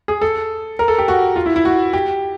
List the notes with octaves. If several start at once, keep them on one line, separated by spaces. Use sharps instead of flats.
G#4
A4
A#4
A4
G4
F#4
F4
E4
E4
F#4
G4